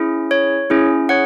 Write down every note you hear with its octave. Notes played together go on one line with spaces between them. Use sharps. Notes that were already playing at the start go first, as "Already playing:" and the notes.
Already playing: C#4 E4 G#4
C#5
C#4 E4 G#4
C#5 F#5